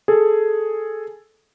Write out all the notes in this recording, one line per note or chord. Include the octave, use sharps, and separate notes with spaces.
G#4 A4